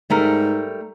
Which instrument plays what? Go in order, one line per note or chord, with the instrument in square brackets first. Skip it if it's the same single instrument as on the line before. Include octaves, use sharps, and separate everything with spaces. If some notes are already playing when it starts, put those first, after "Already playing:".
[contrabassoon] G#2 [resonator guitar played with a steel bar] G3 A3 A#4